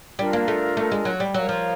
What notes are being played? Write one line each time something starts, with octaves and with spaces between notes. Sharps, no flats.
G3 D4 F4 A#4
A#3
A3
A3
G#3
F#3
G3
F#3 A#4 C#5 F5 A#5
F3